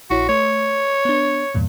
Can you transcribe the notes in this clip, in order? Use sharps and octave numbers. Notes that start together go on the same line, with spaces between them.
A#1 E4 F#4 C#5
A3 C#5
B3 D4
E2 G2 A#2